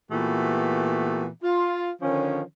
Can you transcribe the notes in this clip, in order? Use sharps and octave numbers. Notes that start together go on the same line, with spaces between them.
A#2 E3 A3 B3 F#4 G4
F4
D3 D#3 F3 C#4